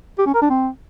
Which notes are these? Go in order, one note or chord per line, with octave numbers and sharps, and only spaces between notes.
G4
C#4
A#4
D4
C4